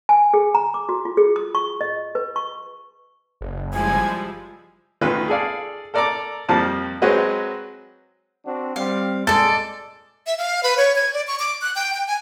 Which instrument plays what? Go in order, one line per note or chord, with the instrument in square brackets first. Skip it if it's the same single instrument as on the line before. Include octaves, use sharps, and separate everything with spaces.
[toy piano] G#5
G#4
A#5
D6
F#4
F4
G#4
D#6
C#6
D#5
B4
C#6
[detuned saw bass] F#1
[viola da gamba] F3 [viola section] G3 G#3 E4 [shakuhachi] G#5
[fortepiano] D2 D#3 B3 F4 B4
G#4 A4 D5 F5
A4 A#4 D5 A5 A#5 D6
F2 F3 G3 A#3 A5 A#5
F#3 G#3 C4 F#4 B4 D#5
[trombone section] C4 D4 F#4
[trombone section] G3 C4 [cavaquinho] F5
[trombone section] A#2 G#3 [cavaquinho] A4 D5 [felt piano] A6
[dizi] E5
F5
B4
C#5
G#6
D5
C#6
D6
F#6
G5
G5
G#5